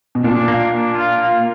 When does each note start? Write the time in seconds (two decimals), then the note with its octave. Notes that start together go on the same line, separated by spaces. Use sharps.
0.15 B2
0.24 A#2 D4
0.48 A#3
0.71 D4
0.95 F4
1.18 A#3